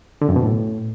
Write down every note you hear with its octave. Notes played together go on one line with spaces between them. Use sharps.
D3
F#2
B2
A2